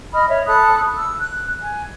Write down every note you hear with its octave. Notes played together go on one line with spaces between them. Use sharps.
D#5 B5 D#6 F6
C#5 E5
A4 B5 D#6 F#6
E6
F#6
G#5